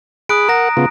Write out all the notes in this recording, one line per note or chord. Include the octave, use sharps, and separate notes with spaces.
G#4 B5 D#6 F#6 D7
A#4 F#5 A#5 A#6
C#3 B3 F4